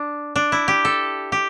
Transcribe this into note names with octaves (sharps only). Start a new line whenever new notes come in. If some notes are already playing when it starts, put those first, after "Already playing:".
Already playing: D4
D4
E4
G4
A4
G4